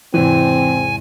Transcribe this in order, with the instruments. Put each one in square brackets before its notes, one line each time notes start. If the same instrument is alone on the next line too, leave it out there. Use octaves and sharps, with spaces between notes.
[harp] E2 G#2 C3 [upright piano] E3 [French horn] C4 [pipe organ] G#5